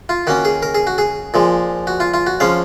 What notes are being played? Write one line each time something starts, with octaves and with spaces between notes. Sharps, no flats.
F4
D#3 A#3 C#4 F#4
G#4
A#4
G#4
F#4
G#4
A#2 F3 G#3
F#4
F4
F4
F#4
F3 G#3 C#4 F5